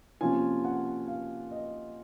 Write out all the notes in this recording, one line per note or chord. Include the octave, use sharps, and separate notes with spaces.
C3 F3 A#3 C#4 F4 G#5
F#5
F5
D#5